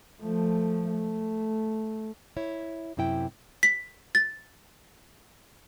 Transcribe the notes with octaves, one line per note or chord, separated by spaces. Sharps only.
F3 A3
A3
E4 C#5
F#2 C3 E4 G5
B6
A6